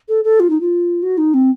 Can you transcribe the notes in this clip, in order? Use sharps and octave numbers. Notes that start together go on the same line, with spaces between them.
A4
A4
F4
D#4
F4
F#4
D#4
C4